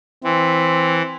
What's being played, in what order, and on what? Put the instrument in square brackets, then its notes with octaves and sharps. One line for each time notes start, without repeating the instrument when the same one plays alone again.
[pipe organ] E3 [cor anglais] C4